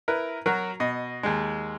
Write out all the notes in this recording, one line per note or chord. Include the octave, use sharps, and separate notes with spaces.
E4 A#4 B4
F#3 F#4 A#4
B2 D#5
D#2 G#3